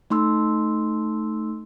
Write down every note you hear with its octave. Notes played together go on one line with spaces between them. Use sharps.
A3 D#4 C6 E6